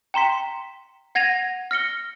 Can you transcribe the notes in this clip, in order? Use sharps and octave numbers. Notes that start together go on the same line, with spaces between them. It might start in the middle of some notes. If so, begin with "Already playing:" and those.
G5 A#5 C6 B6
F#5 G#6 A#6 D#7 F7
F6 A#6 C#7 G7